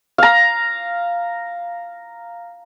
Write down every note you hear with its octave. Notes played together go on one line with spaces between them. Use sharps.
F5 A#5